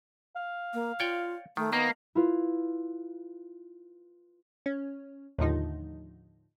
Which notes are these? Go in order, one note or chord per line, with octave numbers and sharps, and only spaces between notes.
F5
A#3
F4 C#5 D5 G5
D#3 A3
A#3 B3 D#5
E4 F4 B4
C#4
D#2 A2 D3 F3 D#4